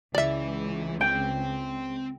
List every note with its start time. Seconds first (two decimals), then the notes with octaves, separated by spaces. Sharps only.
0.15 C#2 E3 D5 E5
1.01 C4 G5